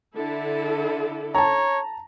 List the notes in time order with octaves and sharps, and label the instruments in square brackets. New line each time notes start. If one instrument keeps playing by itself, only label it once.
[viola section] D3 E4 A4
[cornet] C#5 [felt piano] A5 A#5